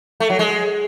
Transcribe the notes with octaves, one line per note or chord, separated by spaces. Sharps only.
A3
F#3
G#3